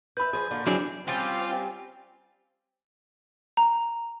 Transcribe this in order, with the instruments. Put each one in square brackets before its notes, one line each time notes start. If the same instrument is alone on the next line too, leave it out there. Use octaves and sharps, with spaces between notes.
[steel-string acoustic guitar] B4 E5 [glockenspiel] B5 G6
[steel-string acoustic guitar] F3 G#4
A#2 D3 F4
[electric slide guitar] F#3 D4 G#4 [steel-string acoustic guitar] C4 E4
[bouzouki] G3 C#4 G4 [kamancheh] C4 [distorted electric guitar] F4
[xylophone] A#5